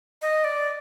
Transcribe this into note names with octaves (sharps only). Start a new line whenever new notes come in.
D#5
D5